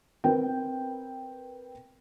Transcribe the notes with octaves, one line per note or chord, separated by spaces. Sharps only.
C4 A#4 B4 G5